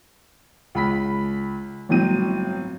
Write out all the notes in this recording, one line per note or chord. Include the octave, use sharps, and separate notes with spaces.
C#2 B5 B6
G1 A2 F#3 C4 D#7